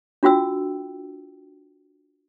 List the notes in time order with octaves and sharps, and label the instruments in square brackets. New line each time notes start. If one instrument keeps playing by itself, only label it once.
[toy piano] D4 F4 F#4 G5 E6